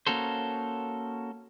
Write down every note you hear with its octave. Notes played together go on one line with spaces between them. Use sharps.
A#3 C#4 F#4 A4 C5